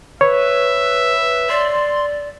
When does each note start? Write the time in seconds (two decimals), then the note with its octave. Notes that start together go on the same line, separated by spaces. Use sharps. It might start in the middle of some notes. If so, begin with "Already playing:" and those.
0.21 B4 C#5 E5
1.50 D5 C6